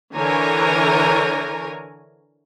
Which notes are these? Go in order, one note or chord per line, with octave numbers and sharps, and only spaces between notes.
D3 E3 A#4 C#5 G#5 A#5